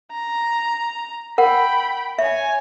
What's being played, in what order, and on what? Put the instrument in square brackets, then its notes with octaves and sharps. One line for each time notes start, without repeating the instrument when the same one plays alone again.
[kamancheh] A#5
[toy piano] A#4 F#5 [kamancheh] G5 B5
[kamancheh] C#5 G#5 [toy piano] E5